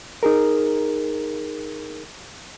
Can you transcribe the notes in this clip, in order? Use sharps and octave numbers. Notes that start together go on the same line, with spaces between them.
D#4 G#4 A#4